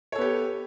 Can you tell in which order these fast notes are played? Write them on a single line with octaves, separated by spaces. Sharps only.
C#5 A4 B3 G4